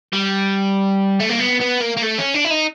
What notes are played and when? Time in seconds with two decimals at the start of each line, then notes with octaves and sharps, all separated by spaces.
0.13 G3
1.20 A3
1.30 A#3
1.40 B3
1.61 B3
1.82 A#3
1.97 A#3
2.03 A3
2.18 C#4
2.34 D4
2.44 E4
2.51 D#4